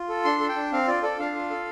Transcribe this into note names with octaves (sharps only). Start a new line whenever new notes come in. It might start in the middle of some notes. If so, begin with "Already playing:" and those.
Already playing: F4
A4
D4 C6
A4
G5
D4
C4 F5
F4 D5
A4 D5
D4 F5
F4
A4